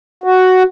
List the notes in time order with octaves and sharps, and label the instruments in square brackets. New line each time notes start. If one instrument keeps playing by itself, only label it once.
[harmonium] F#4